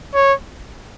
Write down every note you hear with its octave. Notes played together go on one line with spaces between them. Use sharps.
C#5